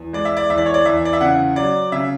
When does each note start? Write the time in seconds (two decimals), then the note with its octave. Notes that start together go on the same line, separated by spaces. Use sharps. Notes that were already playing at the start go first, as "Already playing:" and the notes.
Already playing: E2
0.13 G#3 D5
0.25 E5
0.37 D5
0.50 E2 E5
0.58 D5
0.66 C#5
0.74 D5
0.86 E2 E5
1.05 D5
1.13 E5
1.21 C#3 F#5
1.56 F#3 D5
1.92 C#3 E5